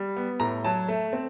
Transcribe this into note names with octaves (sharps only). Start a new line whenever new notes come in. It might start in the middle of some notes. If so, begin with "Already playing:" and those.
Already playing: G3
B3
A2 A#5
F#3 A5
A3
C4